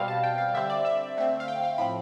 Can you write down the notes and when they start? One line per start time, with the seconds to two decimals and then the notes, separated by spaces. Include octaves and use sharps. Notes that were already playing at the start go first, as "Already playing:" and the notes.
Already playing: B2 G3 C4 F5
0.08 A5
0.24 G5
0.38 F5
0.54 D3 G3 C4 E5
0.70 D5
0.85 E5
1.17 D3 A3 C4
1.40 F5
1.48 G5
1.64 F5
1.78 A2 F3 C4 B5